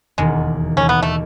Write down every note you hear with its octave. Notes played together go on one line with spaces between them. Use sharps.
E1 D#2 D#3 G#3
E1 D#2 D#3 C#4
B3
A3